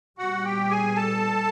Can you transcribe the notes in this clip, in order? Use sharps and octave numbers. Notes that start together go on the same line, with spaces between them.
A#2 G3 B3 F#4 F#5
G4 G5
G#4 G#5
A4 A5